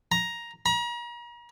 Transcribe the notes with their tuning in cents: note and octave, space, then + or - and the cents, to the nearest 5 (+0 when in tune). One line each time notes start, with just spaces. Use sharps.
A#5 +10
A#5 +40